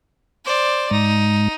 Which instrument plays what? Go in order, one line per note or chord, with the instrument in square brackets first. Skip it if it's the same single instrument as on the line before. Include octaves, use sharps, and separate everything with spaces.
[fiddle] C5 D5
[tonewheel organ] G#2 [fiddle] D#4